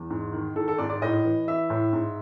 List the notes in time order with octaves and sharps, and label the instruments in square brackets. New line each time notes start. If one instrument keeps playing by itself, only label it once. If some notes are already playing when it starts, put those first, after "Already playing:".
Already playing: [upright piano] E2
G#2
D#3
D#3 A4
A4
G#2 D5
D5
A2 D#5
E3
E3 E5
A2
G#2